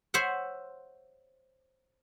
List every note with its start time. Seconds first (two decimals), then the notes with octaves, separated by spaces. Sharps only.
0.14 C5 C#5 E5 F#5